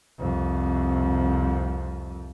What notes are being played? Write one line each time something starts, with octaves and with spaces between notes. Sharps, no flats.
C2 F2